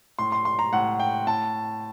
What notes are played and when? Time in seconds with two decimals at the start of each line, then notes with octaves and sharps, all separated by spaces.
0.19 A2 C6
0.32 C6
0.45 C6
0.59 A#5
0.73 A2 F#5
1.00 G5
1.27 A2 A5